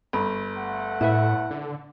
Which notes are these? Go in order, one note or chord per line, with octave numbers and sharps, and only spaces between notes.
G1 A#5 B5
A3 F#5
A2 E4 B4 E5
D3